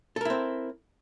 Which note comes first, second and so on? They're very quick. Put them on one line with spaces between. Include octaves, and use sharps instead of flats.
A4 A#4 E4 C4